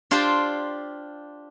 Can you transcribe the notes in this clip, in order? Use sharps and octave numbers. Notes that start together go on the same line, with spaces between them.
D4 F4 G4 C5 D5 G5